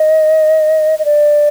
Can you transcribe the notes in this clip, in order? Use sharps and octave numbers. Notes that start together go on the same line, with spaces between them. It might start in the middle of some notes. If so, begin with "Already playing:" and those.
Already playing: D#5
D#5
D5